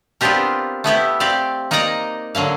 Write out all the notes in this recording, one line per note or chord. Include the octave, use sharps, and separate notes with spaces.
B3 C4 D4 F4 G4 A#4
A3 B3 E4 G4
C4 G4 D5 F5
A#3 D#4 A#4 D5 D#5 A#5
D3 F#3 A#3 F5